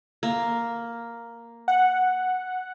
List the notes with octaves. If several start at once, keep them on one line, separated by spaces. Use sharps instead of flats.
A#3
F#5